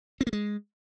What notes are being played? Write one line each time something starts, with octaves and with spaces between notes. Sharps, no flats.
C4
A#3
G#3